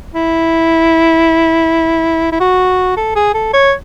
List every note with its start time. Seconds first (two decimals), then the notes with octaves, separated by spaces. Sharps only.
0.14 E4
2.32 E4
2.40 F#4
2.97 A4
3.15 G#4
3.34 A4
3.53 C#5